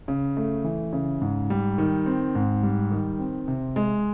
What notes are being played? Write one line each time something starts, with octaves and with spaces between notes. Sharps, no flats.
C#3
A3
E3
C#3
G#2
G3
D#3
C4
G#2
G3
D#3
C4
C3
G#3